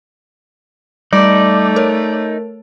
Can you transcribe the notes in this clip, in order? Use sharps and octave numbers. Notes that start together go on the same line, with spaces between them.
G3 A3 D#4 D5
A#4 C#5